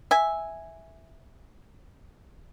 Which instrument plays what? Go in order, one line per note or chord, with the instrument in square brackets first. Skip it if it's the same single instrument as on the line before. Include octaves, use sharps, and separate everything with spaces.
[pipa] E5 G#5